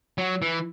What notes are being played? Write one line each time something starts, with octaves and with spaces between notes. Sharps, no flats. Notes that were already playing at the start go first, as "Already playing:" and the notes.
F#3
E3